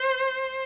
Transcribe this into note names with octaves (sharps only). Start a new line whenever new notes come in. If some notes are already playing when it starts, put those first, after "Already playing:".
Already playing: C5